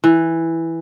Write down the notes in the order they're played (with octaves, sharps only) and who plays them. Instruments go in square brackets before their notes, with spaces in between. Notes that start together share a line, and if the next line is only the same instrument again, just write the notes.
[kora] E3